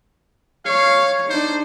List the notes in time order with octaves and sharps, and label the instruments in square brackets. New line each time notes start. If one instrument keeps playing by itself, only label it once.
[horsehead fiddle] C#5 [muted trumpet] F5
[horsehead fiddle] D4 D#4 [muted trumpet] C5